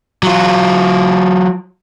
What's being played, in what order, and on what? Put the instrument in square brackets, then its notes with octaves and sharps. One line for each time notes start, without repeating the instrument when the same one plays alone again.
[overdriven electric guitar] F#3 F4